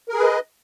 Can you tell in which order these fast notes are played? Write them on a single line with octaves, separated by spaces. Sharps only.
A#4 G#4 B4 D#5